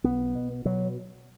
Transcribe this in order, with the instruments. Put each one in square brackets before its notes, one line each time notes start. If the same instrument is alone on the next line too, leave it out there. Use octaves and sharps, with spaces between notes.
[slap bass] B1 B3
B2
B2 F#3